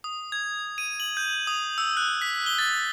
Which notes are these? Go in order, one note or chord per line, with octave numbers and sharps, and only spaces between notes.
D#6
G#6
D#7
F#7
G6
D#6
E6
F#6
B6
G7
A6